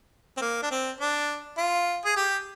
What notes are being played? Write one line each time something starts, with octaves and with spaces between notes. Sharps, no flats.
C4
A#3
D4
C4
D4
F4
G#4
G4